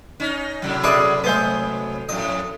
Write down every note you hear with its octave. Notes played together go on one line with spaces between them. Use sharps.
C#4 D#4
A2 C3 F#3
G#4 B4 D5 E5 A5
G#3 A3 B3 B4 C5
F2 A2 D#5